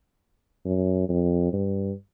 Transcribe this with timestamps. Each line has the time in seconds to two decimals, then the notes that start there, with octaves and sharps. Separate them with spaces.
0.65 F#2
1.09 F2
1.53 G2